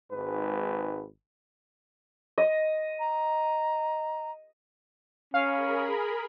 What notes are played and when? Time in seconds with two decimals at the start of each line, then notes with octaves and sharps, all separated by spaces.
0.11 G#1 G#2 B4
2.38 D#5
2.99 A#5
5.34 C#4 G#4 A#4 F5 B5